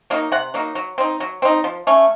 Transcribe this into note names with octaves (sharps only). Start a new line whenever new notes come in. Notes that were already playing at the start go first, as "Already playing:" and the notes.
F#3 A#3 D#4
C3 F#5
F#3 A#3 D#4
F#3
C4 D#4
F#3
C4 D#4
F3
A3 C#4